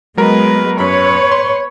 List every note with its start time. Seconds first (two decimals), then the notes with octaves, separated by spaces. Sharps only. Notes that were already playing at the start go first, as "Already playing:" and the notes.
0.17 F#3 G#3 B3 A#4 B4
0.80 F#2 B4 C#5 B5
1.32 C6